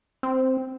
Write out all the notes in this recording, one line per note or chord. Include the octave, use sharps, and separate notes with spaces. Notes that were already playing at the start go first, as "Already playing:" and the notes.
C4